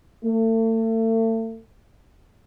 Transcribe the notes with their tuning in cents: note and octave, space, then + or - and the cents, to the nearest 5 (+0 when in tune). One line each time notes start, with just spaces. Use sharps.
A3 +35